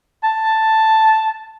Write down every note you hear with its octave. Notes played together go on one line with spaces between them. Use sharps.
A5